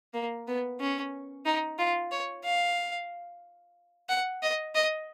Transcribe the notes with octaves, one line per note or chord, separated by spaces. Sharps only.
A#3
B3
C#4
D#4
F4
C#5
F5
F#5
D#5
D#5